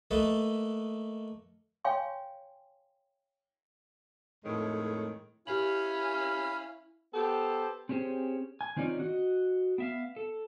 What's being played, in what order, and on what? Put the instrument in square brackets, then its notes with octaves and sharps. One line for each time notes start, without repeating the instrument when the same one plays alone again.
[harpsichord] A3 A#3 A4 B4 D#5
[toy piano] C#5 F5 G5 G#5 C6 C#6
[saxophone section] F2 A2 D#3 G#3 C#5
[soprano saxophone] C#4 [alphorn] E4 [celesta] G4 F#7 [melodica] F5 B5
[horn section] B3 G4 A4 C5
[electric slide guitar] C4 C#4 G4 G#4 C5
G#5
D#3 C4 C#4 D#4 F4 D5
F#4 D#5
B3 E5 F5
A4